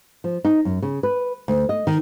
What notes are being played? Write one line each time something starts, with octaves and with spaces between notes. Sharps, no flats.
F3
D#4
F#2
C#3
B4
D2
D#5
D#3